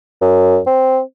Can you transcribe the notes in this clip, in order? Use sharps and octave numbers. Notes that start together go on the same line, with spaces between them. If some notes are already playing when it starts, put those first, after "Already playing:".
F#2
C4